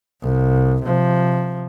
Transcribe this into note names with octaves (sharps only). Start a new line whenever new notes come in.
C2
C3 F3